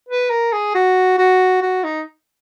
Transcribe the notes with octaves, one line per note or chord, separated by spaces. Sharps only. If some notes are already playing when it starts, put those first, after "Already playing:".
B4
A#4
G#4
F#4
F#4
F#4
D#4